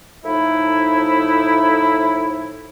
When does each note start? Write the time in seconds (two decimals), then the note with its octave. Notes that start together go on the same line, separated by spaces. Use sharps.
0.25 A2 F3 D#4 E4